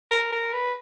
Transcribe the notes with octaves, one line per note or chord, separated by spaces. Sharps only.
A#4
A#4
B4